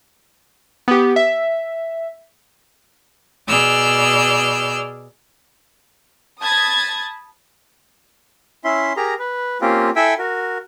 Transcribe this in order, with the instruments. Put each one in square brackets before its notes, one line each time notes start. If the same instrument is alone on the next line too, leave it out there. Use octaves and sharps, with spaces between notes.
[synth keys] B3 G4
E5
[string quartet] B2 G#4 D5 E6 F6 G6
[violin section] A5 B5 D#6 G#6 A6
[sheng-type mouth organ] C#4 E4 E5 C6
G4 G#4 A#4 A#5
B4
A#3 C4 C#4 F4 G4
E4 A4 E5 G5 G#5 E6
F#4 A#4